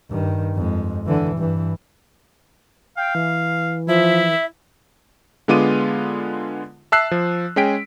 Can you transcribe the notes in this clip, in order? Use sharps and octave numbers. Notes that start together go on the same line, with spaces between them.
G2 D#3
F2 G#3
D3 E3
G2 E3
F5 G5
E3
F3 E4 E5
D3 G#3 B3 F4 D6 D#7
E5 A5 E6 F#6 C7
F3
G#3 C#4 G#4 G5 B6 D7